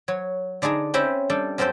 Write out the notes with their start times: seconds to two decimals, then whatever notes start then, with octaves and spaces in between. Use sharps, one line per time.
0.08 F#3 C#5
0.62 D3 D4 D#4 G#4 A#5
0.94 C4 C#4 C5 E5 G5 B5
1.30 G3 D4 A4
1.58 F#2 C4 C#4 A4 C5 G5